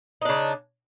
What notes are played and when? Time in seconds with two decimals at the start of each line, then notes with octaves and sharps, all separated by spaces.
0.22 D#4
0.25 D4
0.29 C#3